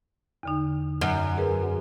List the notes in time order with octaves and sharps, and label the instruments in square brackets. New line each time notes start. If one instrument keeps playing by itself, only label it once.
[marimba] E2 D3 D#4
[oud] F#2
[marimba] G#4 A#4 B4